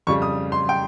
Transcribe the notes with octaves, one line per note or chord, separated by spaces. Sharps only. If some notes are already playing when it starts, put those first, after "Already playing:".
F2 C#3 G3 C#6
D#6
C6
G5